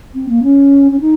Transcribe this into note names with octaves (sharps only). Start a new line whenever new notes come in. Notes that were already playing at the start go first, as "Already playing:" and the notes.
C4
A#3
C#4
C#4
D#4